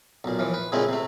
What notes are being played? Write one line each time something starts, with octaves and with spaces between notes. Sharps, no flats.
B1 A#2
D#2 E3 F3
B4
A#2 C#3 G#3 A3 C4 E4
C3 A3